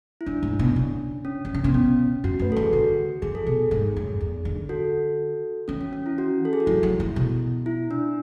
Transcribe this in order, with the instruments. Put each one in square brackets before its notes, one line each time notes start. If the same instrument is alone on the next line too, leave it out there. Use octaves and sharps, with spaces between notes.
[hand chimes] E4
[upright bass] F#2 [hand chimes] D4
[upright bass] G#2
B2
C#3
[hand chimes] C#4
[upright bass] E3
D3
[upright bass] C#3 [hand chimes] B3
[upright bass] B2 [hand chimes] C#4
[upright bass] F#2 [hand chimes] F#4
[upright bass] A2 [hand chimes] B4
[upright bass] E3 [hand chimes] A4
[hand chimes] G#4
[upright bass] D3 [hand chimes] F#4
[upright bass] E3 [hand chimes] G#4
[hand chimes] A4
[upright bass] B2 [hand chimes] G#4
[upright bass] G#2
F#2
E2
D3
[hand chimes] F#4 A4
[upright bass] E3 [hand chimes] C#4
[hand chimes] C#4
C#4
E4
F#4
A4
G#4
F#4
[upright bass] F#3 [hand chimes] E4
[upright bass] F#3
E3
B2
[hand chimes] E4
D4